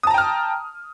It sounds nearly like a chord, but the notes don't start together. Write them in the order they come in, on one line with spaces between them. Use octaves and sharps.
D#6 A5 A#5 G5 F6